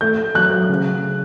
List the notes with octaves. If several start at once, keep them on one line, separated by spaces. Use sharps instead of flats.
A3 G6
F#3 F#6
C#3